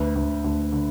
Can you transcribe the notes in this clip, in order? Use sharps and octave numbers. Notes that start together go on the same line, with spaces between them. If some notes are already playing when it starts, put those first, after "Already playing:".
Already playing: D2 B4
D2
D2
D3